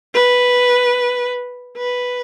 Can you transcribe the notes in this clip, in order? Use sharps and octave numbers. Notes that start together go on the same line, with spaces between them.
B4
B4